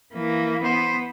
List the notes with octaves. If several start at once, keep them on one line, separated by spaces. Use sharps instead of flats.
E3 A#3
B3 C5